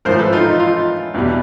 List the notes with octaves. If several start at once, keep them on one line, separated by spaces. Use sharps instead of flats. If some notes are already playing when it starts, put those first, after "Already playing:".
A1 G#2 F3 A#4 C5
A4 B4
D#4 F4
D#4
D#4 F4
E2 B2 G3 B3